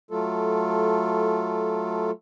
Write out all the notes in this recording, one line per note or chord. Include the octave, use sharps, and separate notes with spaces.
F#3 A3 F4 A4